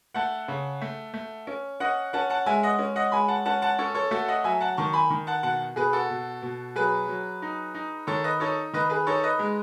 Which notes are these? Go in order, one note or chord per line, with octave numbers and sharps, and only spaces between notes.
A3 F#5 A5
C#3
A3
A3
C#4
C#4 D#5 F#5
C#4 F#5 A5
F#5 A5
G#3 E5 G#5
D#5 F#5
C#4
D#5 F#5
G#3 G#5 B5
F#5 A5
C#4 F#5 A5
F#5 A5
C#4 A4 C#5
A4 C#5
A3 F#4 A4
D#5 F#5
F#3 E5 G#5
F#5 A5
D#3 A5 C#6
G#5 B5
D#3
F#5 A5
B2 F#5 A5
B2 G#4 B4
F#4 A4
B2
B2
F#3 G#4 B4
F#3
D#4
D#4
D#3 A4 C#5
B4 D#5
D#4 A4 C#5
D#3 B4 D#5
G#4 B4
D#4 A4 C#5
B4 D#5
G#3